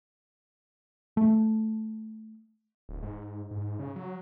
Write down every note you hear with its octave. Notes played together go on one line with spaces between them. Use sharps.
A3
D1
G#2
G#2
C#3
F#3